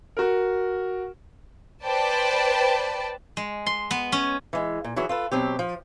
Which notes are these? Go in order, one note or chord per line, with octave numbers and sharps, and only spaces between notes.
F#4 A#4
B4 C5 D5 G5 A5
G#3
C6
B3
C#4
E3 G#3
A#2
E3 F#3 F#4 G#4
F4 A4 B4
B2 F#3 C4 G4
F3